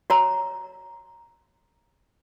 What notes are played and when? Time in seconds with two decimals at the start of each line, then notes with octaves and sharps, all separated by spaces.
0.10 F#4 C#5 A#5